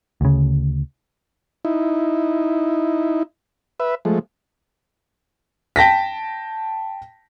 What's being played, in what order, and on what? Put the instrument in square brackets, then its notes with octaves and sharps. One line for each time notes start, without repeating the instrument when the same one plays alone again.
[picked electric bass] D2 C#3
[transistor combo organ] D#4 E4
B4 E5
F3 G#3 A3
[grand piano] G5 A5 A#6 B6